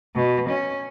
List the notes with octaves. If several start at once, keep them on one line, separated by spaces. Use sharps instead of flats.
B2
C#4